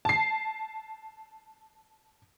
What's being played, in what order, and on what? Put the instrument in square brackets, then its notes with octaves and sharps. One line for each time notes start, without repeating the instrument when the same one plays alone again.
[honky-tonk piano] A5 C7